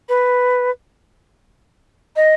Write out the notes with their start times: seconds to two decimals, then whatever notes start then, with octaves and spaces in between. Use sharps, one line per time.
0.09 B4
2.16 D#5